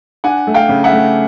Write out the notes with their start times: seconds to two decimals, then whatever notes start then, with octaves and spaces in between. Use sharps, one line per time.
0.24 D4 F#5 G#5
0.47 A3
0.54 F5 G5
0.69 C#3
0.84 E5 F#5
0.92 A3